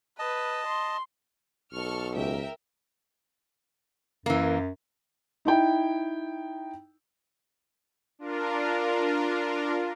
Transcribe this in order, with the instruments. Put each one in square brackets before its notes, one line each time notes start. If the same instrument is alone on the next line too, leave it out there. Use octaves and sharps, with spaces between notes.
[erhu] B4 [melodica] D#5 A5
[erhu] C6
[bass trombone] B1 [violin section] A4 C#6 F6
[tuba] C#2 [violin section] A#4 E5 G5
[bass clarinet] F#2 [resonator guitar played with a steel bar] E3 A#3
[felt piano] D#4 E4 G5
[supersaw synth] D4 F4 A#4